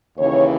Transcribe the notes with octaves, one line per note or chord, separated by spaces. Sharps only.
D#2 C#3 E3 C#5